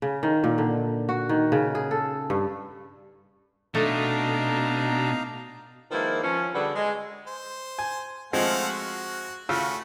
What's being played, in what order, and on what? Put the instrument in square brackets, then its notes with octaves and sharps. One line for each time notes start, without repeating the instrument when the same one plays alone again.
[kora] C#3
D#3
A#2
D3
F#4
D#3
C#3
G#4
A4
G2
[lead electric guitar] B2 [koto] A3 [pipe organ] D4 [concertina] D#4 F5 A#5
[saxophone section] D#3 F3 G#3 A#3 E4 B4
F3 C#4
D3 G3 D4 F#4 G#4 B4
G#3
[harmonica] C5
[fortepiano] G#5
[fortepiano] F3 G#3 C4 [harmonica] A3 F5 F#5
[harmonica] F#4
[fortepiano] C#3 F4 E6 [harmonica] A3 F#4